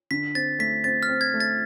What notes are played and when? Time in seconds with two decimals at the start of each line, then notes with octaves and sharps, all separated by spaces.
0.11 D3 B6
0.35 C4 A6
0.59 A3 B6
0.84 C4 A6
1.03 F6
1.09 C4
1.21 G#6
1.34 A3
1.40 A6